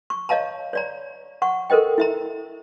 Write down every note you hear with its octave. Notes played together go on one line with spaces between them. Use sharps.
C#6
C#5 D#5 F5 A5 A#5
C#5 D5 A#5
F#5 C#6
A4 A#4 C5 D#5 G5
E4 E5 A#5